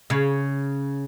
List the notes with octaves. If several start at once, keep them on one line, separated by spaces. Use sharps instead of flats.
C#3